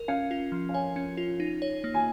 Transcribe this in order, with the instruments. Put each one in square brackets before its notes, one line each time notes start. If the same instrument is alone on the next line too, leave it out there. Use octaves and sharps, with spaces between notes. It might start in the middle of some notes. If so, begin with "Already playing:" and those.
Already playing: [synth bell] A#4
[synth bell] C#4 [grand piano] F5
[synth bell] F4
F3
[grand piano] F5
[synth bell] C#5 [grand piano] G#5
[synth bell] C#4
F4
D#4
C#5
A#3
[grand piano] G#5